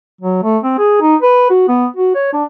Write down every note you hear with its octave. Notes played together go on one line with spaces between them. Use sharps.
F#3
A3
C4
G#4
D#4
B4
F#4
B3
F#4
C#5
D4